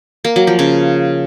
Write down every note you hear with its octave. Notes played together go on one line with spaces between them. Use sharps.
A#3
F#3
F3
C#3